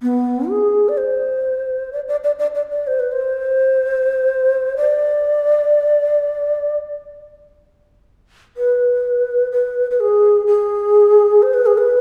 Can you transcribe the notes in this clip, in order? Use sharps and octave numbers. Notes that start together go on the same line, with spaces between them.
B3
G#4
D5
C5
D5
D5
D5
D5
D5
D5
C5
B4
C5
D5
B4
B4
B4
G#4
G#4
C5
B4
G#4
B4